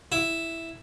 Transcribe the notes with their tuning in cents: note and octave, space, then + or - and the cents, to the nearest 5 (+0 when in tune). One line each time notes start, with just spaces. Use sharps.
E4 +0